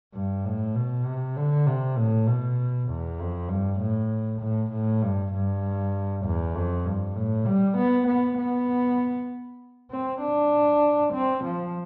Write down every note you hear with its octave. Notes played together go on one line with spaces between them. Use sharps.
G2
A2
B2
C3
D3
C3
A2
B2
E2
F2
G2
A2
A2
A2
G2
G2
E2
F2
G2
A2
G3
B3
B3
B3
C4
D4
C4
F3